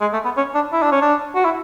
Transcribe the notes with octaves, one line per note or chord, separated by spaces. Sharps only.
G#3
A3
B3
C#4
D4
E4
D4
C#4
D4
F#4
E4